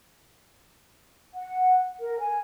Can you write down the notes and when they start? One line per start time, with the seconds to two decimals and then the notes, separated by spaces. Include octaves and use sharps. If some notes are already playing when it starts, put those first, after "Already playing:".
1.35 F#5
2.00 A#4
2.19 G#5